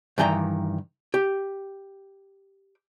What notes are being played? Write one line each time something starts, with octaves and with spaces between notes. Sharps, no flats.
G2 D#3 E3 G5 A#5
G4